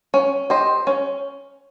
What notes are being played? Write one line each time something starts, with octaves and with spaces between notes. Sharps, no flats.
C#4
G4 C5 D#5
C#4